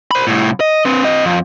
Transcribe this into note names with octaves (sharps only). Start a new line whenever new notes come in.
C5 B5
C2 A2
D#5
C4 B4
C4 D#5
F2